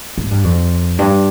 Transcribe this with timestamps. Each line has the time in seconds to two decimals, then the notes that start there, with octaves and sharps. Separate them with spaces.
0.18 G#2
0.31 G2
0.44 F2
0.99 G2